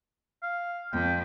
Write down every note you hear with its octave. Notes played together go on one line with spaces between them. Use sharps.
F5
F2 G5